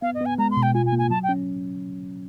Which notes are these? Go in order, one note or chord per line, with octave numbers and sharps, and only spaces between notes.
B3 F5
D#5
B3 G#5
G#3 A#5
C6
B2
G5
F4 G#5
G#5
A#3
G#5
F#3 A5
G5
C#4